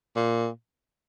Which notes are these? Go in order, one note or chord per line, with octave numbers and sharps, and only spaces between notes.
A#2